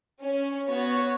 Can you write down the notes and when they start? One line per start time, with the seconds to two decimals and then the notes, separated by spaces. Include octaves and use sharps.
0.21 C#4
0.68 B3 F#4 C#5